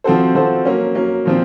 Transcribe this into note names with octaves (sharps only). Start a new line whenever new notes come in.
F3 C4 F#4 A4 C5
F3 C4 F#4 A4 C5
F#3 A#3 C#4
F#3 A#3 C#4
A#2 F3 C4